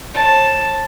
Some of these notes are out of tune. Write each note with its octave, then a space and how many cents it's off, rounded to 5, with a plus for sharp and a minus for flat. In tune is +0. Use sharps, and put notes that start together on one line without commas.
C#5 -45 A5 +0